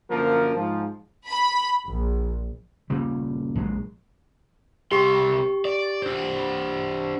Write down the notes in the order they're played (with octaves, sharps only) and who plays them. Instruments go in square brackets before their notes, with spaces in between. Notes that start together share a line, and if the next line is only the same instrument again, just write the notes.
[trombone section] F#2 D3 F3 A#3 A#4
G#2 F3
[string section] B5
A#1
[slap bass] A#2 C#3 G3
A#1 F#3 G#3
[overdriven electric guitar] C2 C6 [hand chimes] G4 C#6
[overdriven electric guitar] D5
D4 C5